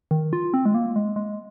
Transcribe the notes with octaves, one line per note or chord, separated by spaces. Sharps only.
D#3
F4
C4
G#3
A#3
G#3
G#3